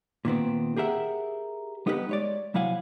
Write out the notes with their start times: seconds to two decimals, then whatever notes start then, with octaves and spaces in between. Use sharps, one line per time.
0.25 A#2 D#3 B3 C4
0.77 G4 G#4 A#4 E5 F#5
1.86 G3 B3 D#4 G4 G#4 B4
2.09 G#3 C#5 D5
2.54 C2 F#3 E4 F5 F#5 G#5